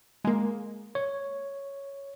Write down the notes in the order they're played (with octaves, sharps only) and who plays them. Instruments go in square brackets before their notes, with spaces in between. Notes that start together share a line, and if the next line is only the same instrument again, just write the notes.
[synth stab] G#3 A#3
[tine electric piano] C#5